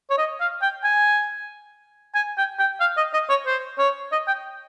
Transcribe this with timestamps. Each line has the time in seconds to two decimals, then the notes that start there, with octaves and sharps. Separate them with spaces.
0.10 C#5
0.18 D#5
0.40 F5
0.62 G5
0.84 G#5
2.15 G#5
2.38 G5
2.59 G5
2.80 F5
2.97 D#5
3.13 D#5
3.30 C#5
3.46 C5
3.79 C#5
4.12 D#5
4.28 G5